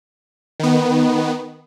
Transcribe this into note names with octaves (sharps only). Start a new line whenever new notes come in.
D#3 B3